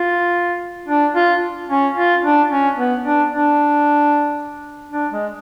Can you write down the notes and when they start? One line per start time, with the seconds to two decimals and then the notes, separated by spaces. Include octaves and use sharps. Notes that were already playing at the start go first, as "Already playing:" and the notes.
Already playing: F4
0.88 D4
1.15 F4
1.69 C#4
1.96 F4
2.23 D4
2.50 C#4
2.77 B3
3.04 D4
3.30 D4
4.92 D4
5.12 G#3